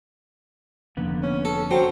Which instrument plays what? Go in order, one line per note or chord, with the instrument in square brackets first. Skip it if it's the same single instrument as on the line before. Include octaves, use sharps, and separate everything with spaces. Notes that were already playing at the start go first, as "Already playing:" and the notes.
[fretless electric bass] F1 F2 D3 [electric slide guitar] A#3 B3
[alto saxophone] C#4
[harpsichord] A4
[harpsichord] F#3 [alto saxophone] C5 [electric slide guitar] G5